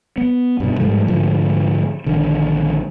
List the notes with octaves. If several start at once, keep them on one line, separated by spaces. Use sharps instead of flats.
B3
G2 B2
G#2 F3 G3 A3
G#2 D3 F3 A3
A#1 D3 D#3